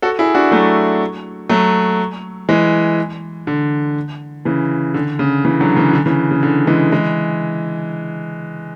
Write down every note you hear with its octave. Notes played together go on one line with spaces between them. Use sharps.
F#4 A4
E4 G#4
D4 F#4
F#3 A3
F#3 A3
E3 G#3
D3
C#3 E3
D3
C#3
C#3 E3
D3 F#3
C#3 E3
D3
C#3 E3
C#3
D3
E3 G#3
E3 G#3